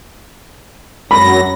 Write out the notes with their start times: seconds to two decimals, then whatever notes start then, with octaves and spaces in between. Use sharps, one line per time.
1.11 F#2 F#3 B5 A#6